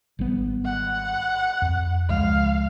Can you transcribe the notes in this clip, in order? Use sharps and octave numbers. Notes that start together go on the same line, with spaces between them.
G#1 G3 B3
F#5
F2
C#2 F3 G#3 F5